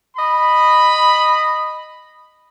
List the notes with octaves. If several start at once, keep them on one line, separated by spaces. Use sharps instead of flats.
D#5 B5